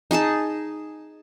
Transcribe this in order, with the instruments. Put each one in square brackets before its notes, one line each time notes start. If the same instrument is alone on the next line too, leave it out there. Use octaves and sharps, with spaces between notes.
[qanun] D#4 G#4 D#5 A5